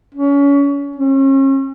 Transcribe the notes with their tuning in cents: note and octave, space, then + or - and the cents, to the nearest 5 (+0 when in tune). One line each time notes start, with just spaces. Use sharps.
C#4 +30
C#4 -40